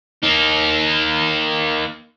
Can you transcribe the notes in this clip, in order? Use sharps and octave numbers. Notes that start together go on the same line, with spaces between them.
A#3 D#4